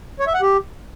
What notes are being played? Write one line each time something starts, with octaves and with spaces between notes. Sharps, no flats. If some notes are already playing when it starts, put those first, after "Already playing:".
C#5
E5
F#5
G4